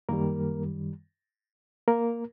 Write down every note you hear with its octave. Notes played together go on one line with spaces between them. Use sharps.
F#2 D#3 G3 A#3 A#4
A#3 A#4